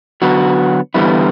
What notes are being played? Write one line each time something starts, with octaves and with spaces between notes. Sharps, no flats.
D3 F#3 B3 F#4
E2 D3 G3 B3 E4